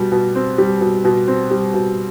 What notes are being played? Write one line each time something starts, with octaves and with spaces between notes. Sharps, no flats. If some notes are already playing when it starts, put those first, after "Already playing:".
Already playing: B2 G3
B2
C4
G3
B2
B2
C4
G3
B2